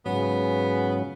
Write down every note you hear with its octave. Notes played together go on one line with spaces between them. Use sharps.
G#2 C#3 F#3 B3 C#4